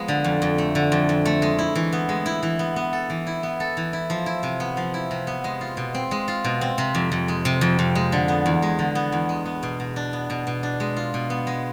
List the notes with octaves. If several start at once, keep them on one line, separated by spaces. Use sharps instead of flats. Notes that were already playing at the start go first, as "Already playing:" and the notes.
Already playing: F3 G#3 B3
D3
F2
F2
A3
D3
F2
F2
A3
G#3
E4
E3
B3
G#3
E4
E3
B3
B3
A4
E3
E4
B3
A4
E3
E4
F3
E4
C3
B3
F3
E4
C3
B3
G#3
F4
B2
C4
G#3
F4
B2
C4
C3
F2
F2
G#3
C3
F2
F2
G#3
D3
B3
E2
G#3
D3
B3
E2
G#3
B3
B2
B2
D4
B3
B2
B2
D4
G#3
F4
B2
B3
G#3